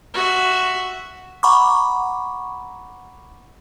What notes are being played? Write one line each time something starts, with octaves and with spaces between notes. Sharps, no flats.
F#4 E5
F#5 A#5 B5 C#6 D6